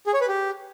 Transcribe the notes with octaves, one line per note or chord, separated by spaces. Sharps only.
G#4
C#5
B4
G4